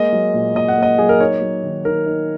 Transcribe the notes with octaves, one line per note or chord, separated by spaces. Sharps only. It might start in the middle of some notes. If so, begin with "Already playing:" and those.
Already playing: G#3 A#3 D#5
F#3
A#2
A#2 D#5
F#5
A#3 D#5
F#3 G#4
A#4
D#4 C#5
F#3
D#3
D#3 A#4
D#4